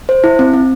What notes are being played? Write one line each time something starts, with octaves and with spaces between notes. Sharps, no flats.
C5
E4
C4
C4